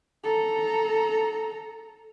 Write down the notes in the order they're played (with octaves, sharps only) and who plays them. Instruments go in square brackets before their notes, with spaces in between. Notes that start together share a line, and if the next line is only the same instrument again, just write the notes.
[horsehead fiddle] A4 A#5